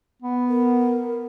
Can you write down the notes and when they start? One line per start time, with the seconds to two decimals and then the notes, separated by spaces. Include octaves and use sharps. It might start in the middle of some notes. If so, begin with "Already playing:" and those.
0.22 B3
0.49 A#4